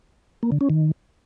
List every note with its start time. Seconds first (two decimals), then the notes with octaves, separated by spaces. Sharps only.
0.43 A#3
0.52 D3
0.61 C#4
0.70 D#3